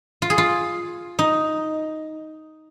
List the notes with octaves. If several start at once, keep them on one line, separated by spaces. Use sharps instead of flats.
F4
G#4
F4
D#4